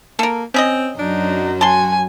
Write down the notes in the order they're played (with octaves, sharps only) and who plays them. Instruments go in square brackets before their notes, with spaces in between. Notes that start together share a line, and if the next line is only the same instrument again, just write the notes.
[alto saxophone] A#3 [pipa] A4 A#4
[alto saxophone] C4 [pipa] C#4 G#4 D#5
[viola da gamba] F#2 F#3 [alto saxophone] D4 [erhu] D#4
[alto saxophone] F#4 [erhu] G#5 [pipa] A5 C6